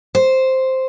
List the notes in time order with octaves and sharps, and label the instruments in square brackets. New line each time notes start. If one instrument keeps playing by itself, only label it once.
[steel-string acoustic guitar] C5